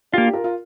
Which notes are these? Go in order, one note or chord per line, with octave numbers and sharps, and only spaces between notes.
D4 F4 G4
A#3
G4
F4 A#4
F4